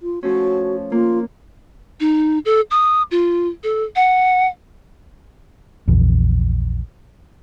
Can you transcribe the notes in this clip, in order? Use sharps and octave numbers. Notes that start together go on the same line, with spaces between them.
F4
F3 A3 C#4 F#4
A#3 F4
D#4
A4
D#6
F4
A4
F#5
A#1 E2